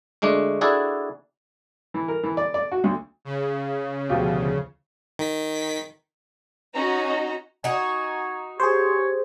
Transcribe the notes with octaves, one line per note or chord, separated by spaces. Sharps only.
D2 G#3 A3 D4
D4 E4 F#4 G#4 A4 D5
E3
A#4
E3
D5
D5
F#4
D2
C#3
D2 B2 F3 F4 G4
D#3 B6
C#4 D#4 F#4 D#5 A#5
D#4 F#4 G#5
G4 G#4 C5 C#5